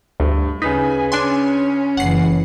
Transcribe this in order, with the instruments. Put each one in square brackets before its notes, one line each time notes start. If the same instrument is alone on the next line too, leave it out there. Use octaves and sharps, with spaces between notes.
[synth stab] D2 [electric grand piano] G2
[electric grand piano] C#3 B4 B6 [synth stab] D#4 [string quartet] G#5
[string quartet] C#4 [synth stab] D4 G#5 C6
[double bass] F#1 E3 [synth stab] F#5 C7